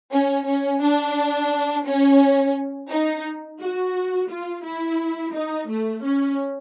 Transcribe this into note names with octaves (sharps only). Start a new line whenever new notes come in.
C#4
C#4
D4
C#4
D#4
F#4
F4
E4
D#4
A3
C#4